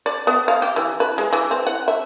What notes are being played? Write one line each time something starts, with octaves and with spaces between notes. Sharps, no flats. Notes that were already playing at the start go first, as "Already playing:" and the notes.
D5
B3
F5
G4
E3
B4
G#3
E3
C4
F#5
E5